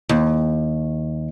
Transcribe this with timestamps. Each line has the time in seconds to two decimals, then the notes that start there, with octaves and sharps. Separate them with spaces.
0.09 D#2